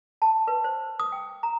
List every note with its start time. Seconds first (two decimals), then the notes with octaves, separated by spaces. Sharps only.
0.22 A5
0.47 B4
0.64 C5
1.00 D#6
1.12 G5
1.43 A#5